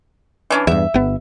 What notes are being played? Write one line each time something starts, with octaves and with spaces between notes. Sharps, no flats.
E3 C#4 D4
E2 G2 E5
G1 B3